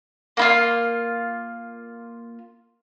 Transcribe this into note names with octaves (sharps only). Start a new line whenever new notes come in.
A#3 E4 F4